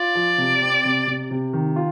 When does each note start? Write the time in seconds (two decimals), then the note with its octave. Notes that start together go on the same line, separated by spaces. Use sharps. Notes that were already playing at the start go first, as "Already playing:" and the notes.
Already playing: F4 D5
0.15 F3
0.38 C3
0.62 C4
0.85 C3
1.07 C3
1.31 C3
1.53 D#3
1.76 F4